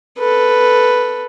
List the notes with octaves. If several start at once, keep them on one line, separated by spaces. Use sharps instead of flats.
A4 B4